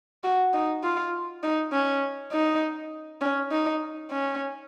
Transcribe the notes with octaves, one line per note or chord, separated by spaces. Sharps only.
F#4
D#4
F4
D#4
C#4
D#4
C#4
D#4
C#4